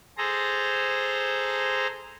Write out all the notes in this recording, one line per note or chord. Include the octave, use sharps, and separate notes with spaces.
G#4 A4 C5 A#5